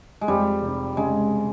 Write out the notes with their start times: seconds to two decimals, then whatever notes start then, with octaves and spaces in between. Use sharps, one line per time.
0.21 G#3
0.28 F2 G3
0.63 F1
0.97 C#3 G#3